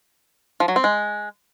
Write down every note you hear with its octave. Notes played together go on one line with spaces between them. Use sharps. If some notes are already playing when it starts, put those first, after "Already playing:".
F3
F#3
C4
G#3